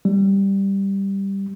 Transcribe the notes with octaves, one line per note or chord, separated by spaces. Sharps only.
G3